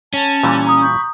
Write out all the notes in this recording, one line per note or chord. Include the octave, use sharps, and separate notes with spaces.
C#4 A5
A#2 E3 G3
A#5 D#6
B5 C#6 G6